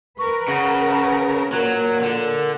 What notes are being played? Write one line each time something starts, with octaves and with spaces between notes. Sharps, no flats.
A#4 B4 C#6
C#3 F#5
A#2 F#3 A#4
D3